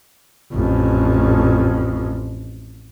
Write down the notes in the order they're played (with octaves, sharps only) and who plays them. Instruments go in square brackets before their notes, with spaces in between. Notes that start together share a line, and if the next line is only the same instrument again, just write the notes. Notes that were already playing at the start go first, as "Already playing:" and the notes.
[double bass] A1 F2